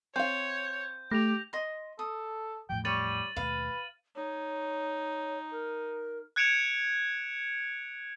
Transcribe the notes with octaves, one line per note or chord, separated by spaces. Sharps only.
C4 C#5 F5 G6
A3 G4 A#6 F7
D#5 C6
A4 D#6
E2 A2 F3 G5
G3 C#5 A6 D#7 F#7
D#2 B2 A3 B4 F5
D#4 C#5
A#4
F#6 G#6 C#7 D7 E7 F7